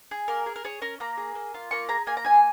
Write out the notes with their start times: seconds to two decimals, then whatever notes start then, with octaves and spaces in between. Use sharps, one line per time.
0.11 G#4
0.28 A#3 A#4
0.46 G#4
0.56 A#4
0.65 G#4 C#5
0.81 C#4 A#4
1.00 A#3 A#5
1.17 G#4
1.35 A#3
1.54 F4
1.71 A#3 C#6
1.89 G#4 A#5
2.07 A#3 G#5
2.17 A#5
2.24 G#4 G#5